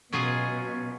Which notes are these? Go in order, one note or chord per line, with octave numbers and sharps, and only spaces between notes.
B2 F#3 C#4 F4 G#4